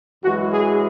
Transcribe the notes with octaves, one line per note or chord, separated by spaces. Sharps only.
F#2 E3 G#3 F#4
G#4